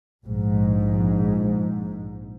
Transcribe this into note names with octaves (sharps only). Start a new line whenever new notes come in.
A#1 G#2